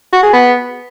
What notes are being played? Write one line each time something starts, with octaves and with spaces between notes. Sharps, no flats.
F#4
G#4
B3